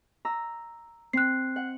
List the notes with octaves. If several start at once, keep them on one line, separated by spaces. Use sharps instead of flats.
A#5 E6
C4 F#6 C7
F#5